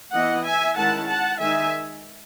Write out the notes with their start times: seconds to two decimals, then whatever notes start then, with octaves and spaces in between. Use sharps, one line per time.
0.14 E3 B3 E4 D#5 F#5
0.45 E5 G#5
0.77 D#3 G#3 C#4 E4 F#5 A5
1.08 F#5 A5
1.40 D#3 G#3 D#4 E5 G#5